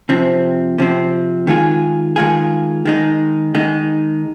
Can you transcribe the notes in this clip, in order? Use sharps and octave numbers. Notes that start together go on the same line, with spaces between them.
C3 F3 C4
C3 F3 C4
D#3 G#3 F4 G#4
D#3 G#3 F4 G#4
D#3 G#3 D#4
D#3 G#3 D#4